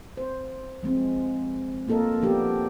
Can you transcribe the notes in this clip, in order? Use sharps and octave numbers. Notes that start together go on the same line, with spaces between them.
C5
F3 G#3 C4
A#3 F4 A4 A#4 D#5
F3 B3 D4 G4 A#4